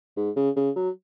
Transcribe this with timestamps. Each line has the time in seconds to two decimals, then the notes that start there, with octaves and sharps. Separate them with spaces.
0.17 G#2
0.36 C#3
0.56 C#3
0.76 F#3